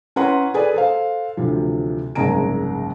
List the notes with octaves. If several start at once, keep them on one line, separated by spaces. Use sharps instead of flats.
C#4 E4 B4 F#5 A#5 C6
G#4 A4 B4 D5 G#5
A4 C5 F5
D2 C3 E3 F3
F#1 C2 G#2 G#4 A#5 D7